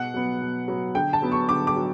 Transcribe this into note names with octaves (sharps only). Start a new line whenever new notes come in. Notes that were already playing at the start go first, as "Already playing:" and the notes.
Already playing: B2 F#5
F#3 B3
B2
F#3 B3
D3 G5
A5
F#3 B3
C#6
D3 D6
D6
F#3